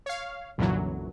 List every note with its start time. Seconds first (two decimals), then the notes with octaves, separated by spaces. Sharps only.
0.06 C#5 F5
0.58 C2 F#2 A#2 D3 E3 F#3